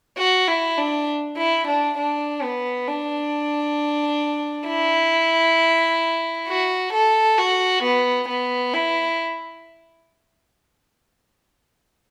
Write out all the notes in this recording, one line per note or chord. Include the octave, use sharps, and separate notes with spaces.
F#4
E4
D4
E4
D4
D4
B3
D4
E4
F#4
A4
F#4
B3
B3
E4